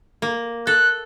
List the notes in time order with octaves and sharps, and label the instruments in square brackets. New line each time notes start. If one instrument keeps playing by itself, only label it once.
[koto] A#3
[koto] A4 [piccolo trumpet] F#6